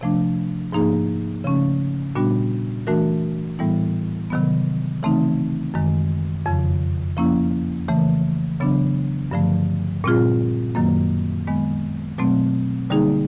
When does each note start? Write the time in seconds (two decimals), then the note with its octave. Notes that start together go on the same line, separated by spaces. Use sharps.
0.01 C3 F3 A3 D4
0.72 G#2 F3 A#3 D#4 G#4
1.44 C#3 F3 A3 C#4
2.15 A#2 G3 B3 D4 F#4
2.87 E3 A3 D4 F#4 A#4
3.59 A2 E3 G3 B3 E4
4.30 C3 D#3 F#3 B3
5.03 C#3 E3 A3 C4 D#4
5.74 F#2 D#3 G#3
6.46 F2 C#3 F3
7.17 F3 A#3 C#4 E4
7.88 C#3 E3 A3
8.60 C#3 F#3 B3 D4
9.31 G2 D3 F3 A3
10.04 A#2 G3 C4 F4 G#4
10.75 F#2 D#3 F#3 A#3
11.47 D#3 G#3 B3
12.18 B2 F#3 A3 C4
12.90 D3 G3 A#3 D#4 G#4